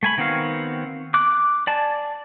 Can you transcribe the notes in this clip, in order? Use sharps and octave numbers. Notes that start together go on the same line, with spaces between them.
A3 G#5 B5
D#3 B3 C4 F#4 F5
D6 F#6
D5 G#5 A5